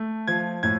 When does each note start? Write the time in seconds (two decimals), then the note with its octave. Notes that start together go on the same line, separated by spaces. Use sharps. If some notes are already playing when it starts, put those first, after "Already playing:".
Already playing: A3
0.28 F3 G#6
0.63 A2 G#6